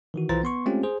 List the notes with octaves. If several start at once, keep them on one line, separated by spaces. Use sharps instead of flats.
D#3 E3 F#4
B1 E3 F4 C5 A#5 A6
B3 C6 C#6
G#3 A3 C4 C#4 F4 G4
G#4 C5